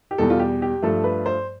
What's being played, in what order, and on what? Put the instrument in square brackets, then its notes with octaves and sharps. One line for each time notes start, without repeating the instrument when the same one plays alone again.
[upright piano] G4
E2 B2 G3 A4
F4
G4
G4
G2 F3 A3 A4
B4
C5